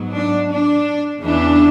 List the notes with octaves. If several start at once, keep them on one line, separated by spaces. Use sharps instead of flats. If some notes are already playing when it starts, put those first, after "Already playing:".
Already playing: G#2 F#3 B3
D4
D4
E2 C#3 E3 D4